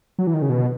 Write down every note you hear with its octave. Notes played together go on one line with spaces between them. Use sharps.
F#3
E3
D#3
C#3
B2